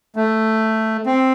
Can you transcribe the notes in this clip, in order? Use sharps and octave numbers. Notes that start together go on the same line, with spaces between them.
A3
C4